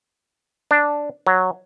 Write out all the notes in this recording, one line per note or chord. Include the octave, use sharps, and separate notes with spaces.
D4
F#3